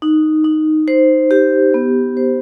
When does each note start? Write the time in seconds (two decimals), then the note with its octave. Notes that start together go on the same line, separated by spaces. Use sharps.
0.02 D#4
0.44 D#4
0.88 C5
1.31 G4
1.74 B3
2.17 C5